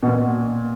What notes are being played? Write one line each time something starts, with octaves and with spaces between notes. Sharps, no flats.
B2
A#2